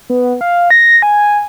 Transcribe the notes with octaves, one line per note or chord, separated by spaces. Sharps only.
B3
F5
A#6
G#5